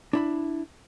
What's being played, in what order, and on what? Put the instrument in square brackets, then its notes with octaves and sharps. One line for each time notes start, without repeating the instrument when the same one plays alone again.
[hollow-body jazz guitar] D4 E4 B5